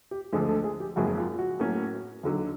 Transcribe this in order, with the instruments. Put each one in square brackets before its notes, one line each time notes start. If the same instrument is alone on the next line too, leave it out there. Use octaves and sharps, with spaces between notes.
[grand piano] G4
[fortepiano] D2 D3 F3 G#3 [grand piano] G#4
[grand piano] A4
G#4
G4
[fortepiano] G#1 F#2 C#3 F3 A#3 [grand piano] F#4
[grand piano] F4
F#4
[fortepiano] A2 F#3 A#3 C#4
D#2 D3 F#3